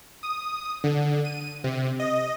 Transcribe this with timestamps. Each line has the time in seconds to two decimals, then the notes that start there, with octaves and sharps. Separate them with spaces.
0.23 D#6
0.84 D3
1.25 D#7
1.64 C3
2.00 D#5